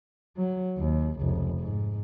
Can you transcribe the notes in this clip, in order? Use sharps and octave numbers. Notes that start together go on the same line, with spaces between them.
F#3
D#2
F1 C#2
G#2